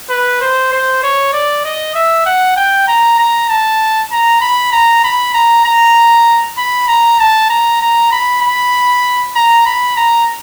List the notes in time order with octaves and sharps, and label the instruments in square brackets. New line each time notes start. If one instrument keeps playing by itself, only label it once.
[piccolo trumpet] B4
C5
C5
C#5
D5
D#5
E5
F#5
G5
A#5
A#5
A5
A#5
B5
A#5
B5
A#5
A#5
B5
A#5
A5
A#5
A#5
B5
B5
A#5
B5
A#5